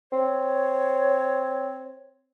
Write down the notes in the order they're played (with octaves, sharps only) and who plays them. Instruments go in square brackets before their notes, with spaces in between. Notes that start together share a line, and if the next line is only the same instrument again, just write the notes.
[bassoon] C4 [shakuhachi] C#5